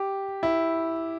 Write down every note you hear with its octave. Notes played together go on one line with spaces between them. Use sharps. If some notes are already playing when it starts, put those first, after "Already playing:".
Already playing: G4
E4